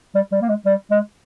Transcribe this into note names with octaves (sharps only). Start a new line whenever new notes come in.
G3
G3
A#3
G#3
G3
G#3